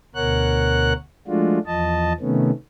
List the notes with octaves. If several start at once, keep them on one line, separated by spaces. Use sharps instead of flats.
D2 B2 A#4 C#5 F#5 F#6
F3 G#3 A3 D4 F4 F#4
E2 F3 D#5 A5
C3 D#3 A3 B3 C#4